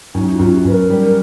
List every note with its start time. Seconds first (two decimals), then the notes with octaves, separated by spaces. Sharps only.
0.14 F#2 D#4
0.33 F4
0.39 F#2
0.53 G4
0.65 F#2 B4
0.72 A#4
0.90 G3